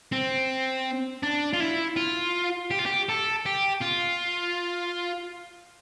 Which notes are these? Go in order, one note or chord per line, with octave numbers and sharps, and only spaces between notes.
C4
D4
F4
E4
F4
G4
F4
G4
A4
G4
F4